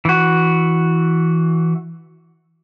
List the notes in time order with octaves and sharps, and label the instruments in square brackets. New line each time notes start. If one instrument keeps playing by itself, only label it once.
[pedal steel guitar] E3 F#4